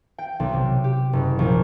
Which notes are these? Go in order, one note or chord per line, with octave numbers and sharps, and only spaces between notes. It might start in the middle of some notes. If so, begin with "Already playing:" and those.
G5
B1
C3
G4
F#1
A#1